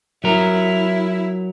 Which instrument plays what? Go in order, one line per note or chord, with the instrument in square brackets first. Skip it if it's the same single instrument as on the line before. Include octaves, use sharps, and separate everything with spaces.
[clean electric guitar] F#3 A#4 [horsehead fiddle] E4 E5